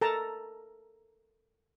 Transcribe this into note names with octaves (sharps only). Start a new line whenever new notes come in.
A4 A#4 A5 A#5